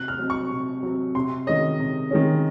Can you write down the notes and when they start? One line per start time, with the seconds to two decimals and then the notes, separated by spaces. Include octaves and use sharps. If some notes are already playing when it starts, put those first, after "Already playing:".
Already playing: C3 F#6
0.08 F6
0.19 F#3 C4
0.30 C#6
0.51 C3
0.83 F#3 C4
1.15 C3 C6
1.47 D#3 G#3 C#4 D#5
1.79 C3
2.11 D#3 G#3 C#4